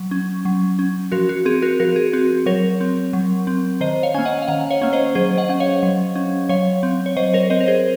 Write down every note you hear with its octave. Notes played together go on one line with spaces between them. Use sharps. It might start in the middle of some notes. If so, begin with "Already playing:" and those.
Already playing: F#3
C#4
F#3
C#4
F3 F#4 A#4
F#4
C4 G#4
F#4 A#4
F3 F#4 A#4
G#4
C4 F#4
F#3 A#4 C#5
C4
F#3
C4
D#3 C5 D#5
C#5 F5
A#3 C#4 G#5
D#5 F#5
F5
D#3 D#5 F#5
C#5 F5
A#3 C#4
C5 D#5
F#3 G#4 C5
D#5 F#5
C#4 F#5
C#5 F5
F#3
C#4
F#3 C#5 F5
C4
C#5
F#3 C5 D#5
A#4 C#5
C4 C5 D#5
A#4
G#4 C5